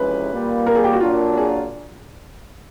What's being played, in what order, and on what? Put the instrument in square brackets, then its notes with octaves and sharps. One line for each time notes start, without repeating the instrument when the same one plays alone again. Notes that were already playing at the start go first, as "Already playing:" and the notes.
Already playing: [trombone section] F2 C3 E3 G#3 C#4 [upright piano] B4
[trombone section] A#2 G3 A#3
[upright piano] A#4
G#4
G4
F#4
[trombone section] A#2 F#3 A#3 D4 [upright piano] F4
[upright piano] G#4